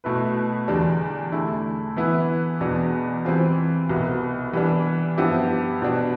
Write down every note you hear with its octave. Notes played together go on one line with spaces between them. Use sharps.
B2 A3 E4 B4
E2 D3 G3 D4
D3 A3 E4
E3 B3 E4 B4
E2 B2 B3 D4
E3 G3 C4 F4
C2 B2 B3
E3 G3 B3 D4
G2 F3 B3 E4 G4
B2 B3 D4